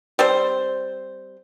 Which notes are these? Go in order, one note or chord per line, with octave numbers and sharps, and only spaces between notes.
G3 C4 C5